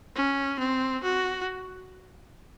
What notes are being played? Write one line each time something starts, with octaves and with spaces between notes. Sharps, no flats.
C#4
C4
F#4